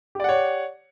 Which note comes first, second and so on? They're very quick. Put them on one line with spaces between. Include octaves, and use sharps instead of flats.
G4 D5 F#5 C#5